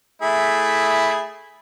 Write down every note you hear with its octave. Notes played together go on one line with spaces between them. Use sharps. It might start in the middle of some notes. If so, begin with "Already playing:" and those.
A3 E4 G#4